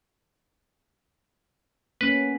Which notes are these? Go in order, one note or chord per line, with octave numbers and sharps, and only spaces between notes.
A#3 B3 C#4 B4